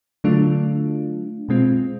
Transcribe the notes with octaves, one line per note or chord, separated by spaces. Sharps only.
D3 F#3 A3 D4 F4
B2 G#3 C4 F4